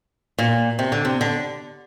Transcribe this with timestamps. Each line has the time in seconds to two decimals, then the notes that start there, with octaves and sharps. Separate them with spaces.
0.38 A#2
0.79 C3
0.92 D3
1.05 C3
1.21 D3